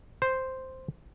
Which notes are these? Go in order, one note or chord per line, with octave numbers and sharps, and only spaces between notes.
C5